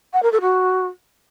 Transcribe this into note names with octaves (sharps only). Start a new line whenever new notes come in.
F#5
A#4
A4
F#4